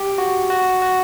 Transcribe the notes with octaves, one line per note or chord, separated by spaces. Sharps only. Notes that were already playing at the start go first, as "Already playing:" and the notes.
Already playing: G4
F#4
F#4
F#4